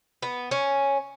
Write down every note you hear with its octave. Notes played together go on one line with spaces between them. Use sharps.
B3
C#4